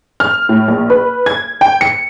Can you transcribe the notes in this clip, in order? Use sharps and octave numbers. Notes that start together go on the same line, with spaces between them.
F6
A2
A#1
B4
G#6
G5
C#7